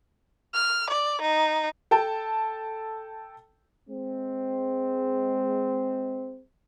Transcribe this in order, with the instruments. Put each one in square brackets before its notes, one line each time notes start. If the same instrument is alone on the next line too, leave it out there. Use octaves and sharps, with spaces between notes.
[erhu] F6
D5
D#4
[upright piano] A4 G5 A5
[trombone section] G#3 C4